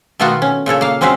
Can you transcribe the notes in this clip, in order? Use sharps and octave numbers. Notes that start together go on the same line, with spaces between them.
B2 D#3 A3 B3 F4 F#4
C#4
A#2 C#3 A4 C#5
A#3 F5
G#3 C4 C#4 F#4 E5 F5